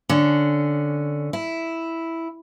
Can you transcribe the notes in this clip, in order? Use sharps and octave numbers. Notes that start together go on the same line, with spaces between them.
D3 C#4
E4